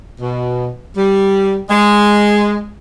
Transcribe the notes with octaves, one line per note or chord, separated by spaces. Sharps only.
B2
G3
G#3